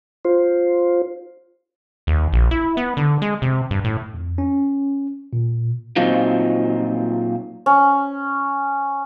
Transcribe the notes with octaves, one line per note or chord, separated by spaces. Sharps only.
F4 C5
D#2
A#1
E4
B3
D3
G#3
C3
G2
A2
F2
C#4
A#2
A#2 F#3 C4 D#4 F4
C#4